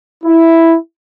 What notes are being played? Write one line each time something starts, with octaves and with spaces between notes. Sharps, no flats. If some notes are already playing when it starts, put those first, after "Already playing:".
E4